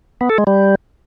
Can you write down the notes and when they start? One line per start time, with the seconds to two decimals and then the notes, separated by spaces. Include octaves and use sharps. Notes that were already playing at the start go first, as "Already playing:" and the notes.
0.21 B3
0.30 A4
0.38 G#3
0.47 G3